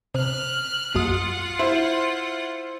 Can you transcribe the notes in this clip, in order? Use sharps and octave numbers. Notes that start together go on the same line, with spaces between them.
C3 F6 F#6
A#1 F#2 F4 F#5 D#6
E4 C5